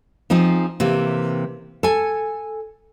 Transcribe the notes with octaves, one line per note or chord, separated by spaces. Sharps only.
F3 C4 D#4 G#4
C3 E3 A#3
A4 G#5